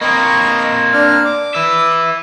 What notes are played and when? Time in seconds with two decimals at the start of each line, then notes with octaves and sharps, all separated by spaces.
0.01 A#3 C4 D#5 B5 C#6
0.93 D4 F6
1.25 D6
1.55 B4 E5